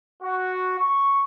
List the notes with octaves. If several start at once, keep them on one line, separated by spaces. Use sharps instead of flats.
F#4
C#6